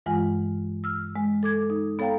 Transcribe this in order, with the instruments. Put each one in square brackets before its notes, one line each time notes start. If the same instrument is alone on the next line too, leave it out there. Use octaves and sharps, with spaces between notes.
[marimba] G2 E3 G#3 F4 F#5 G#5
E6 F6
G#3
A4 D6 G#6
D#4
B3 A4 C#5 F5 G5 A#5